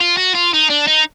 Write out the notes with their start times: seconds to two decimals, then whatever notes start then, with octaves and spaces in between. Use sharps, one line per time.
0.01 F4
0.18 F#4
0.35 F4
0.53 D#4
0.70 D4
0.88 D#4